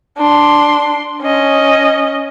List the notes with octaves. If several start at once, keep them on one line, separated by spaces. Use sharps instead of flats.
D4 C6
C#4 D#5